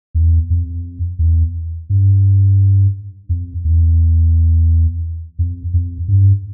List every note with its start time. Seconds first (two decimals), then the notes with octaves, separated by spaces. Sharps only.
0.15 E2
0.50 F2
1.19 E2
1.90 G2
3.29 F2
3.64 E2
5.39 F2
5.74 F2
6.08 G2